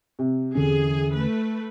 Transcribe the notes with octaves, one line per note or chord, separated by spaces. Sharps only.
C3
E2 D3 C#4 G#4
A3 B4